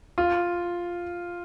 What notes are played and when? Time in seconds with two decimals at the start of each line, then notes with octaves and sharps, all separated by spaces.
0.18 F4